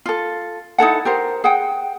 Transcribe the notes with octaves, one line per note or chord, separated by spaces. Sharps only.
F4 A4
D#4 E4 A4 F#5
G4 A#4 C5
G#4 F#5 G5